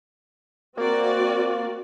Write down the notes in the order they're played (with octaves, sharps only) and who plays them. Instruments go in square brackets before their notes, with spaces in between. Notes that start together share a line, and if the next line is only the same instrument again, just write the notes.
[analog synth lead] A#3 [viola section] C4 F#4 D5